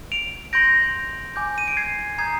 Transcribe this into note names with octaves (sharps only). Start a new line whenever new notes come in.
D7 F7
C6 G6 A#6 D7
G#5 D6 G6
D#7
D7
G#6 C7
A#5 D#6 G6 G#6 C7